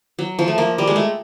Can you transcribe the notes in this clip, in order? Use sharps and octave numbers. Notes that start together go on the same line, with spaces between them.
F#3
F3
A3
A#3
G3
G#3
A3